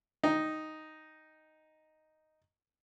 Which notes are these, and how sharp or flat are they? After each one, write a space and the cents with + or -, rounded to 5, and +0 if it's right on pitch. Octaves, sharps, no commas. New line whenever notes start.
D#4 +0 G5 +0